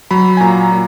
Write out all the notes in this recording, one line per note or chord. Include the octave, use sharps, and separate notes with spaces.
F#3 B5
G#5
A#2 A#5
A#2